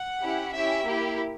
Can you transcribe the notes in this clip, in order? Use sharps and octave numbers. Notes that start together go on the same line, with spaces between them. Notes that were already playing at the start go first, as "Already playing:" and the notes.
Already playing: F#5
C#4 E4 G4
C#4 E4 G4 E5
A#3 E4 G4